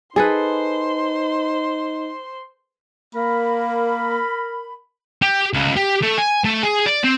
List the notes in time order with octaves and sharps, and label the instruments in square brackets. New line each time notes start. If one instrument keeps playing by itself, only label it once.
[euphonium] D#4 [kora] G#4 A4 B4 [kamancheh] C5 C6
[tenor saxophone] A#3 [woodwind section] A#4 B5
[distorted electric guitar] G4
C#2
G4
A3
G#5
A3
G#4
D5
C4